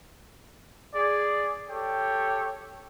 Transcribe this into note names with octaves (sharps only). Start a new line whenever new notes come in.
G#4 D5
G4 A4 C#5 G5